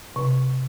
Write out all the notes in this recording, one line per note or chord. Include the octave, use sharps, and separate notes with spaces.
C3